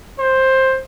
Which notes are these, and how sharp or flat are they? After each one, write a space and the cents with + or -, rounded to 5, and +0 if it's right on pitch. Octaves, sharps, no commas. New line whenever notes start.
C5 +10